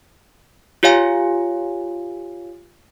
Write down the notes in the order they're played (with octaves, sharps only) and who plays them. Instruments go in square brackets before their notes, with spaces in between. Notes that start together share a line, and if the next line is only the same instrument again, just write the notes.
[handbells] F4 G4 C#5 F5 G#5